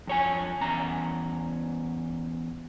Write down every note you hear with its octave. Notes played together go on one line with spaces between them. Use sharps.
F2 C#5 G#5
E2 C#4 A#5